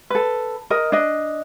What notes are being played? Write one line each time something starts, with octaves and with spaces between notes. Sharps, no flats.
A4 B4
A#4 D#5
D4 D#5